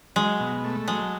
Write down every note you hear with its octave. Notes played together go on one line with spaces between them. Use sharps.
F#3 G#3
B2
A3
F#3 G#3